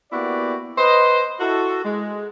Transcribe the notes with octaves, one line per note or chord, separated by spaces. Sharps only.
A#3 B3 E4 F#4 G4 D5
B4 C5 D#5
E4 F#4 A4
G#3